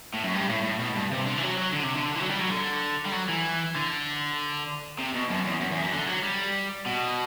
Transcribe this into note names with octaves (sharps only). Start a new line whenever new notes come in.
A2
F#2
G2
A2
A2
B2
G2
C3
D3
E3
F#3
F#3
D3
C3
D3
E3
F#3
G3
F#3
D3
G3
F#3
E3
D3
C3
B2
F#2
E2
F#2
E2
F#2
D3
F#3
G3
B2